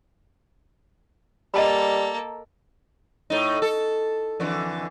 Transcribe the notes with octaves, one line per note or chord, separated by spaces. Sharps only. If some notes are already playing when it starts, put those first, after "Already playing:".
G3 A#3 A4 D#5 A5 B5
A2 D#4
A4
F2 D3 E3